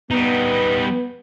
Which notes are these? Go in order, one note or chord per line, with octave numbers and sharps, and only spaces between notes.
G3 B3 D#4